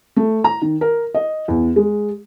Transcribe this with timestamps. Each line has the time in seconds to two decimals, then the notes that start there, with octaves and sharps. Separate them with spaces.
0.16 A3
0.44 A#5
0.62 D#3
0.81 A#4
1.14 D#5
1.48 E2
1.76 G#3